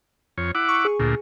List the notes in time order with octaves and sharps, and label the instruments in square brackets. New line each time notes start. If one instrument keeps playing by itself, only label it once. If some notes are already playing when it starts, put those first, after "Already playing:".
[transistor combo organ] F2 C#5
E4 F#5 D6
[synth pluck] C#6
G#4
[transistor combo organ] D2 A#2